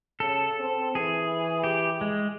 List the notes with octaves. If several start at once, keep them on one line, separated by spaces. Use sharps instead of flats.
C#3 A4
C4
E3 G#4
G4
G#3